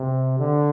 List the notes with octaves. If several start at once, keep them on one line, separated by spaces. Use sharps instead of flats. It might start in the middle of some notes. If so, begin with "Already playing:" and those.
Already playing: C3
D3